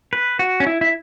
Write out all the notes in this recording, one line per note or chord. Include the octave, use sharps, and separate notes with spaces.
B4
F#4
C#4
E4
E4